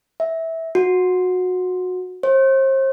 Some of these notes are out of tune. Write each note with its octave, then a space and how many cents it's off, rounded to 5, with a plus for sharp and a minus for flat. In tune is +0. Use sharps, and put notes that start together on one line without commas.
E5 -15
F#4 -20
C5 +40